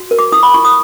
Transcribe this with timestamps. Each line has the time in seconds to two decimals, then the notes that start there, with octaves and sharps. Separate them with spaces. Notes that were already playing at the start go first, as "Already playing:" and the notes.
Already playing: F#4
0.11 A#4
0.19 D6
0.32 E4 D#6
0.43 B5
0.54 E4 C#6
0.65 D#6